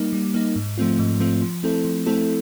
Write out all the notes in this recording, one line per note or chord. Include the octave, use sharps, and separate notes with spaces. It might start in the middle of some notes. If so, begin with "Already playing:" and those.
Already playing: G3 A#3 D#4
G3
A#3 D#4
G#2
F3 A3 C4 F4
G#2
F3 A3 C4 F4
F3
A3 C4 E4 A4
F3
A3 C4 E4 A4